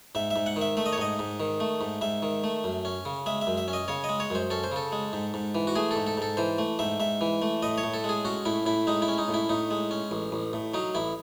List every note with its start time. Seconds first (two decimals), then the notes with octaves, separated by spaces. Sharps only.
0.15 G#2 E5
0.31 E5
0.36 G#2
0.46 F#5
0.56 D#3
0.61 E5
0.77 A3 E5
0.86 D#5
0.93 C#5
0.98 G#2 D#5
1.19 G#2
1.40 D#3
1.60 A3
1.81 G#2
2.01 G#2 E5
2.23 D#3
2.44 A3
2.64 F#2
2.85 C#4
3.05 C#3
3.26 G#3 E5
3.42 E5
3.47 F#2
3.58 E5
3.68 C#4
3.73 D#5
3.88 C#3 C#5
4.04 D#5
4.09 G#3
4.20 C#5
4.30 F#2 C5
4.50 C#4 A4
4.64 C5
4.72 C#3 A4
4.92 G#3
5.13 G#2
5.34 G#2
5.55 E3
5.67 F#4
5.76 A3 G#4
5.91 A4
5.96 G#2
6.07 A4
6.17 G#2 A4
6.37 E3 C5
6.58 A3
6.79 G#2 E5
7.00 G#2 E5
7.21 E3
7.42 A3
7.63 A2 D#5
7.78 C#5
7.83 A2
7.94 A4
8.04 G#3 G#4
8.25 C#4 F#4
8.46 A2 E4
8.66 A2 E4
8.87 G#3 D#4
9.02 E4
9.08 C#4
9.18 D#4
9.28 A2
9.34 E4
9.49 A2 D#4
9.71 G#3
9.91 C#4
10.11 A1
10.32 A1
10.53 A2
10.74 F#3 D#4
10.95 A1 E4